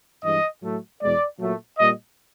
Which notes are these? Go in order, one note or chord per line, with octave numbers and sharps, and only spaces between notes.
G2 E3 G#3 D#5
A2 F#3 A3
E2 B2 G#3 D5
A#2 F#3 A3
A#2 G3 D#5